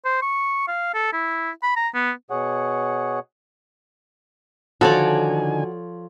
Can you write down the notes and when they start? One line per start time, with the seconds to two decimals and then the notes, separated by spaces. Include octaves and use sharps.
0.05 C5
0.22 C#6
0.68 F5
0.94 A4
1.13 E4
1.63 B5
1.76 A#5
1.94 B3
2.30 B2 G#4 C#5 F#5
4.81 D3 D#3 F3 F#4 A4 C#5 D5 G#5